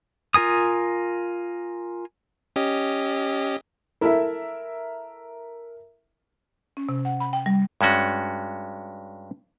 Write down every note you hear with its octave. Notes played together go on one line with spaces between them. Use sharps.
F4 A#4 G#5 D#6
C#4 G4 D#5
E4 A4 A#4 E5
C#4
C3
F#5
B5
G5
G3
G2 G#3 C#4 F#4